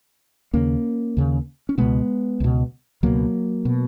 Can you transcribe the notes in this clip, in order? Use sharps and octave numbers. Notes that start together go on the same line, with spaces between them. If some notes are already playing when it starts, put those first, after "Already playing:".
D#2 C#3 A#3 C#4
D#2 C#3
C#4
C#2 B2 G#3 B3
C#2 B2
C#2 B2 F#3 A#3
B2